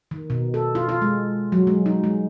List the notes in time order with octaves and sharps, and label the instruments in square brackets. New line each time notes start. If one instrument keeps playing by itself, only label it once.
[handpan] D#3
B2
A4
F4
F4
G#3
F#3
G#3
D#4
G#3